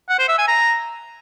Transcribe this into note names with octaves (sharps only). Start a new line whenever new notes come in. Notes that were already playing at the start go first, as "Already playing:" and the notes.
F#5
C5
E5
G#5
A#5